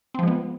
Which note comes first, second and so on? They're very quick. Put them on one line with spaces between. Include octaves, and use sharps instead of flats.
C4 F3 G#3 B3